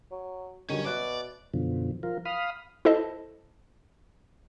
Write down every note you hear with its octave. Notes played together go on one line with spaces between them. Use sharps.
F#3
D3 D#3 F#3 G3 C#4
B2 C#5 D5 E5 F#6
F#2 B2 D3 F3
F3 F4 A#4
F5 B5 D#6 F6
E4 A4 C5 D#5 A5